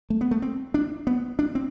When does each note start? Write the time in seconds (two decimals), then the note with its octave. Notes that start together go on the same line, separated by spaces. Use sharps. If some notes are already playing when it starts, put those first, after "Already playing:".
0.10 A3
0.21 B3
0.31 A3
0.42 C4
0.74 D4
1.07 B3
1.39 D4
1.55 C4